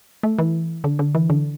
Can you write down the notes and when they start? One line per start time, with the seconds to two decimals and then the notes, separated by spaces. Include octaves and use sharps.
0.23 A3
0.39 E3
0.84 D3
0.99 D3
1.15 E3
1.30 D3